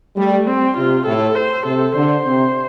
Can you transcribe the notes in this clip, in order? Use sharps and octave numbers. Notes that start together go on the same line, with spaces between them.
G3 A3
C4
C3 F4
A2 A4
C5
C3 A4
D3 C5
C3